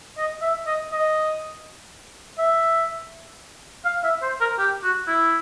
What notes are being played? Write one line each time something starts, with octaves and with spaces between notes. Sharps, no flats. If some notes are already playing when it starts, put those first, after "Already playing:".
D#5
E5
D#5
D#5
E5
F5
E5
C5
A#4
G4
F#4
E4